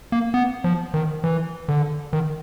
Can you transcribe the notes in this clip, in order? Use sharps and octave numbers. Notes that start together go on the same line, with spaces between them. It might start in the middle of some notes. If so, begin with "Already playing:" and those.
A#3
B3
F3
D#3
E3
D3
D#3